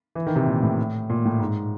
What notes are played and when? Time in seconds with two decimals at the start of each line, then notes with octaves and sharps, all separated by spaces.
0.15 E3
0.27 D#3
0.36 C3
0.46 A#2
0.63 A2
1.10 A#2
1.25 A2
1.40 G#2